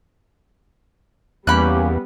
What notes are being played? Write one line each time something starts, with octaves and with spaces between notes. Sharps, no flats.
E2 G3 A#3 B3 C#4 G4 B5 F#6